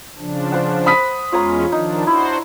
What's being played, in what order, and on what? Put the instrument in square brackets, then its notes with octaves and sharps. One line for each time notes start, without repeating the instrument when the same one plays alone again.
[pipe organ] C#3 F3 D4
[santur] C5 F#5
[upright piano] B5 D#6 B6
[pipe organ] E2 G#3 C#4 [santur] F4 C#5 A#5
[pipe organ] D#3 F3 D4 [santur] D#4
[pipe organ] D4 F#4 C5 [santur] E4